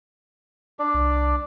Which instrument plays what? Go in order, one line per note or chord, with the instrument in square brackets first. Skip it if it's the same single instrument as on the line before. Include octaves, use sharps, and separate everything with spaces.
[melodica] D4 D5
[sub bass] C2